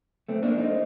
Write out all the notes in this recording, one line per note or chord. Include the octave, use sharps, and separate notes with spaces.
A3 C4
A#3 D4
C4 D#4